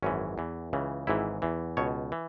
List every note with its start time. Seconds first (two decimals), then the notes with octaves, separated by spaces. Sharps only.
0.03 G#1 F#2 E3 C#4
0.38 E2 E3
0.73 C#2 C#3 E3
1.07 G#1 G#2 E3 E4
1.42 E2 E3
1.77 C#2 B2 C#5
2.12 E3